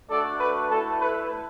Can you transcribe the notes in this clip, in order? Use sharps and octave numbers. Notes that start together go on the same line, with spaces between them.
A3 D4 F#4 A4 D5
B4
A3 E4 A4
B4